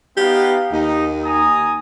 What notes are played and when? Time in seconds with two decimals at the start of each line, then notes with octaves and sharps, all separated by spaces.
0.17 B3 D#4 G4 F5
0.72 D#2 D#4
1.25 G#5 A#5 D#6